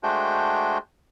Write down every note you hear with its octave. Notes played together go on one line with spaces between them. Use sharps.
G#3 A3 D4 F#4 C5 G5